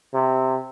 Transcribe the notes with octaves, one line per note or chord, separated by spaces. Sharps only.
C3